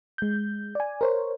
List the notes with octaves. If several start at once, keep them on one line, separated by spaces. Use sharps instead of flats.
G#3 G6
D5 G#5
A#4 C5 C#5